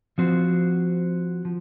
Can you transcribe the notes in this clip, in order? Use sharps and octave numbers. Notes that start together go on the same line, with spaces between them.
F3 C4 F#4 C5
F3